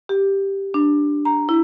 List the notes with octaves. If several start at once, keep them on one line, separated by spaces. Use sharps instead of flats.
G4
D4
A#5
E4